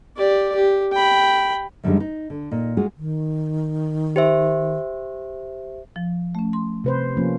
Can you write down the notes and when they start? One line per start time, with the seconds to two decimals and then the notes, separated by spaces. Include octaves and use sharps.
0.17 G4 D5
0.55 G4
0.92 G5 B5
1.83 F#2 D3 D#3 F3 G3 G#3
2.00 D#4
2.30 D3
2.51 A#2 D#4
2.77 G#3 F4 F#4 G#4
2.97 D#3
4.16 G4 C5 E5
5.96 F3
6.35 A3 C#4
6.53 C6
6.84 C3 B4 C5
7.17 F3 A#3 C#4